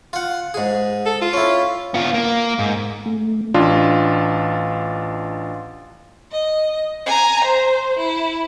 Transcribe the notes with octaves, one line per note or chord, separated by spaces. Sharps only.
F4 F#5
G#2 G#4
A4
F4
C#4 E4
B3 F4
A#3
G#2
A3
A1 D4 F4
D#5
G#5 A#5
C5
E4